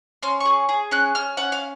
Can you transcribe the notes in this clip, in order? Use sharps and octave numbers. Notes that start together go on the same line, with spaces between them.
C#4 C6
G#4 C#6
G#4
C#4 F#6
C#4 F6
C#4 F#5
F5